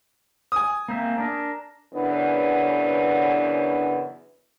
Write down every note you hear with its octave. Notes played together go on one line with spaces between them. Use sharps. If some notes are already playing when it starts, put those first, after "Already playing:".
G#5 D#6
A#3 C4 E5
D4 A#4
F#2 C#3 E3 B3 D4